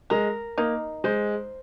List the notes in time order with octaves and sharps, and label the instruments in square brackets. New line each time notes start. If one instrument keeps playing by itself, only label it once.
[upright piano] G#3 [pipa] A#4
[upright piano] A#3 [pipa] D#4
[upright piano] G#3 [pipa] C5